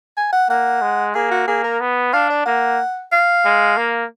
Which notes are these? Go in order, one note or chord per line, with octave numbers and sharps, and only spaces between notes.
G#5
F#5
A#3 F#5
G#3
A#3 G#4
F#4
A#3 G#4
A#4
B3
D4 F5
D5
A#3 F#5
F5
G#3
A#3